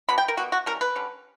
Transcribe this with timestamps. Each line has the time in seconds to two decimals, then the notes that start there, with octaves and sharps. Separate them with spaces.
0.09 F#3 B3 D4 B5
0.18 G5
0.28 A#4
0.37 B2 G3 B3 F#4
0.52 F#4
0.66 E3 G3 C#4 A#4
0.81 B4
0.96 D3 G3 C#4